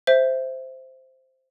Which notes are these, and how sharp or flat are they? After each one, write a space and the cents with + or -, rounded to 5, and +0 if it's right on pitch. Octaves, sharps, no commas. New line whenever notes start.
C5 +0 E5 +0